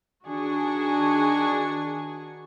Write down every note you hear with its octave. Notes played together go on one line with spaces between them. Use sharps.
D#3 D4 F#4 G#4 C#6